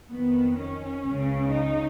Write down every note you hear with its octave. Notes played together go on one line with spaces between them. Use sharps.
F2 D#3 B3
C#4
C#2 C#3
D#4